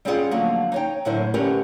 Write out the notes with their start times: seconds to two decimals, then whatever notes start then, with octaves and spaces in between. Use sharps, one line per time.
0.05 G3 C4 C#4 F4 G#4 F#5
0.31 D3 F3 F#3 A3 A#3
0.72 D#4 C#5 G5
1.05 A2 D3 F#3 E4 A#4 C5
1.34 D3 A3 C#4 G4 A#4 B4